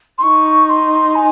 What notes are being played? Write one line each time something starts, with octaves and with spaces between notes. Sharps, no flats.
C6
D#4 C#6
C6
G#5